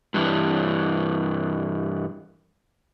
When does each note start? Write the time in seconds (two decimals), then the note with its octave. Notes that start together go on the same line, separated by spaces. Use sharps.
0.14 G2 E3